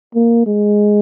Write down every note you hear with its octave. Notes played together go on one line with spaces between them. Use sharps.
A#3
G#3